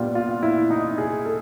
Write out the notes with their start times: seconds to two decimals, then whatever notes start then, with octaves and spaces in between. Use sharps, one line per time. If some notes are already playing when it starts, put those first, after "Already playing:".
Already playing: A#2 G3 B3 D4 F4
0.15 F4
0.43 E4
0.70 D#4
0.98 G#4
1.25 A4